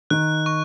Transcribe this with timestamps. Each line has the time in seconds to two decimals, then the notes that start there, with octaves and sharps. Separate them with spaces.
0.10 D#3 F#6
0.46 C#6